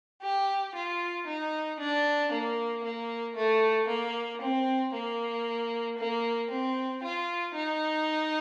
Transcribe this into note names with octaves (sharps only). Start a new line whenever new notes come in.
G4
F4
D#4
D4
A#3
A#3
A3
A#3
C4
A#3
A#3
C4
F4
D#4